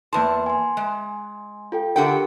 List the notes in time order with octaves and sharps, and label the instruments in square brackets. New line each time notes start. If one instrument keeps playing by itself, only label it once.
[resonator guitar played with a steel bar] E2 A5 [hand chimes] A#3 B4 C6
[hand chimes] G#5 C6
[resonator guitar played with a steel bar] G#3
[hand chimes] F4 A4 G5
[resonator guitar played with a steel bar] D3 F#5 G5 [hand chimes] D4 G4 A#4